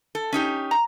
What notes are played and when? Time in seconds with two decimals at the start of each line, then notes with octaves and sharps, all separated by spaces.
0.15 A4
0.33 C#4 D#4 G4
0.71 A#5